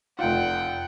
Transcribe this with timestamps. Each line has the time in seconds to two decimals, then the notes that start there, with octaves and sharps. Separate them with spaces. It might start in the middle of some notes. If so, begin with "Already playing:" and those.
0.19 F1 F4 F#5 G5